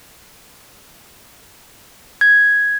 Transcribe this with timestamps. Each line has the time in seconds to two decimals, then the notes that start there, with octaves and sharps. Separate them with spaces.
2.21 G#6